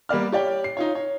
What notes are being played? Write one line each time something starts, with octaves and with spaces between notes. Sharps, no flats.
G3 A#3 B3 D5 F6
G4 C#5 D5 G5
C7
D#4 F4 C#5
C#5